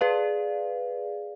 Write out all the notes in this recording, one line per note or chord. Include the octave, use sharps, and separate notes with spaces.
G#4 B4 D5 F5